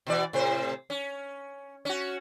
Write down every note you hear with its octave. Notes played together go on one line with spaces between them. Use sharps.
B2 E3 D5
A2 C3 C5
C#4
C#4 F#4